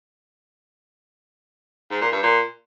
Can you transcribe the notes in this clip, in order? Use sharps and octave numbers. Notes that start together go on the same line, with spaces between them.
G#2
A#2
G2
A#2